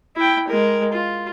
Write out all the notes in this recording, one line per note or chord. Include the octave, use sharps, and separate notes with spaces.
E4 G5
G#3 A#4
F4